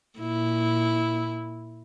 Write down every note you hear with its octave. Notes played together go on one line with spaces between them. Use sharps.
A#2 E4